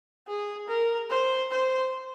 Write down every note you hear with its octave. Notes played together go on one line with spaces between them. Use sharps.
G#4
A#4
C5
C5